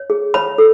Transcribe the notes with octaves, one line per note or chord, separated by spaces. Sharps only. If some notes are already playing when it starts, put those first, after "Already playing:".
Already playing: C#5
G#4
C#5 B5
A4